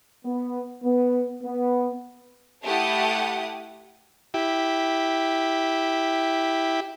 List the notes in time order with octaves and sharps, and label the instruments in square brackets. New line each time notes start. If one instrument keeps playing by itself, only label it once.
[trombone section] B3
B3
B3
[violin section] A3 E4 G4 F#5 A5 D#6
[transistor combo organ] E4 G4